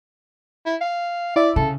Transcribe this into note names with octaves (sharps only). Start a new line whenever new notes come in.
E4
F5
E4 D5 E5
C#3 A4